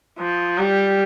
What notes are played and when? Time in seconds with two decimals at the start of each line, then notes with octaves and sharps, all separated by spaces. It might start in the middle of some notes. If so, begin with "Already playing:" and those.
0.19 F3
0.58 G3